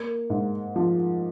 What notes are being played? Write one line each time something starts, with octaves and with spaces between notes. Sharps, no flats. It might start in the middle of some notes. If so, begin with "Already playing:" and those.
Already playing: A#3
G#2
F3